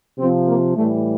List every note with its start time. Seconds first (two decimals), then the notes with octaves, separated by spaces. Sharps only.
0.18 C3 F3 C4
0.47 A#3
0.75 A2 E3 G3 A3